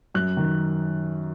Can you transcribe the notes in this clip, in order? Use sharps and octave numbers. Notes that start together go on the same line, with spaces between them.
F#2 F#6
D#3